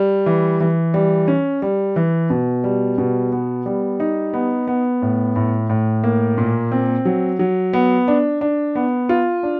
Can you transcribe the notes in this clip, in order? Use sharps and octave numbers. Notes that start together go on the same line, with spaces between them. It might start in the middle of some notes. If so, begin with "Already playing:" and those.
Already playing: G3
E3
E3
G3
C#4
G3
E3
B2
G3
B2
B3
G3
D#4
B3
B3
A2
A2
A2
A#3
A#2
C4
F#3
F#3
B3
D4
D4
B3
F4
D4